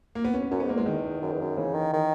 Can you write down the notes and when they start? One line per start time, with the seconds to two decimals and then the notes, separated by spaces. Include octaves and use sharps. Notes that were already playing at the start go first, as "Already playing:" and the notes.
0.15 A#3
0.25 B3
0.34 C#4
0.42 B3
0.51 F#2 C#4
0.60 G#2 B3
0.69 A#3
0.75 E2 G#3
0.86 D#3
1.22 F#2
1.32 E2
1.41 F#2
1.58 C#3 E3
1.74 D#3
1.93 D#3